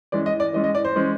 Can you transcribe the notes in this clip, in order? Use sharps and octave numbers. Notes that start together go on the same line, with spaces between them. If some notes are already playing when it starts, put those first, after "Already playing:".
E3 G#3 C#4 D5
D#5
D5
E3 G#3 C#4 D#5
D#5
D5
C5
E3 G#3 C#4